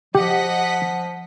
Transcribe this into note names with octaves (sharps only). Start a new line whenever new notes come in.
F3 G4 D#5 F#5 B6